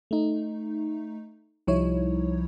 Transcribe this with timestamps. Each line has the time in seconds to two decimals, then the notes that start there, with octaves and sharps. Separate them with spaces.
0.11 A3 D#4
1.67 C2 F3 G3 D#4 E4 C#5